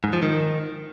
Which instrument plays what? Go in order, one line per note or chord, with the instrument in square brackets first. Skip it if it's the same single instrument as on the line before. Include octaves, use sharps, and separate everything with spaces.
[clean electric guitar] G#2
F3
D#3